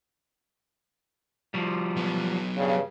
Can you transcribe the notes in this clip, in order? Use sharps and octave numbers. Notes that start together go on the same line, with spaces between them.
F3 G3
F#3 B3
G2 C#3